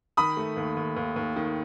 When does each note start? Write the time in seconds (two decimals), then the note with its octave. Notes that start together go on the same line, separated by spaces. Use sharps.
0.17 D#3 B5 D#6
0.37 A3
0.57 D#2
0.77 D#2
0.96 D#2
1.16 D#2
1.36 D#3